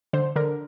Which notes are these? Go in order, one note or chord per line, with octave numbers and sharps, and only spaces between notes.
D3 C5
D3 A#4